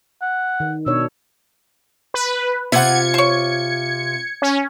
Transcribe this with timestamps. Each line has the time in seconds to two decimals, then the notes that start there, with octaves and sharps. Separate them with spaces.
0.22 F#5
0.60 D#3
0.86 B2 D4 C#5 E6
2.14 B4
2.72 C3 F4 E5 F#5 G#6 C#7
3.14 C5 C#5
4.42 C#4